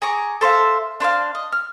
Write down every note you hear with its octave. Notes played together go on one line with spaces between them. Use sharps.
G#4 A#5 C#6 D6
A4 C5 E5 F5
D4 C5 C#5 F5
D#5
F6